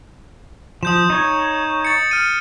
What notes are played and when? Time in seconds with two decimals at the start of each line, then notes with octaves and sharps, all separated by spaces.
0.83 F3 D#6 G6 E7
1.10 D#4 C#5
1.85 A6 C#7
2.11 F6 D#7